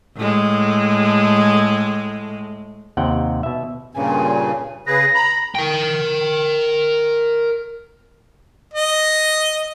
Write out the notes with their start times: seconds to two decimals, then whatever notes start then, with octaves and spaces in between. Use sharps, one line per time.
0.18 A2 G#3
2.97 D#2 C3 F#5 G5
3.43 B2 E5
3.95 G2 A#2 C#3 G#5
4.87 C#3 G#4 B4 A#6
5.15 A#5 B5
5.55 A#4 G5
8.74 D#5